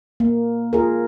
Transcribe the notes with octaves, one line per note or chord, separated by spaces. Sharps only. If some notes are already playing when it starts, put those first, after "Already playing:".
A#3
F4 G#4 A#4